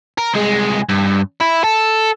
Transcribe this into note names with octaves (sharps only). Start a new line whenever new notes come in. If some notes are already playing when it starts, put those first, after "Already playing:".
A#4
C2 G#3
G2
E4
A4